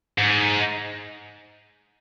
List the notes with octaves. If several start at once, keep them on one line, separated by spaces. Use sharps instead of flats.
G#2